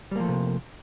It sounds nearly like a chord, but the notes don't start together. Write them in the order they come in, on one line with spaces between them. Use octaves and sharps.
G3 A#3 F3 A3 C3